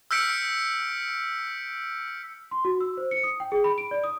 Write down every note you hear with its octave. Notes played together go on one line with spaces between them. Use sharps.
E6 F6 G6 B6 C#7 D7
C6
F#4
E6
C5
C#7
D#6
G5
G#4
B5
D7
D5
D#6